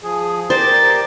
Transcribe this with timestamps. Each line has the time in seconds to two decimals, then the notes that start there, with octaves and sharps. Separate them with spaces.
0.03 F3 G#4
0.50 G4 A#4 C5 D5 A6